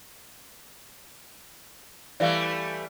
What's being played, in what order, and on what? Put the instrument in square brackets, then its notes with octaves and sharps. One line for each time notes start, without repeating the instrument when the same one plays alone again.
[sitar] E3 G3 A3 [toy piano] D5 F5